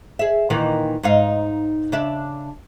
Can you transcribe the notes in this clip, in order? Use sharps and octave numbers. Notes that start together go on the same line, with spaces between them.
G#4 E5
A#2 D#3 E3
G#2 D#4 F5
C#3 D4 E5